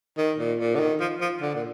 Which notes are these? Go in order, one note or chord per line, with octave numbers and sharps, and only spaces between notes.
D#3
A#2
A#2
D3
D#3
F3
F3
D3
A#2